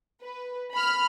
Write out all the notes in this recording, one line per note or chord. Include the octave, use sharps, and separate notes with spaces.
B4
B5 F6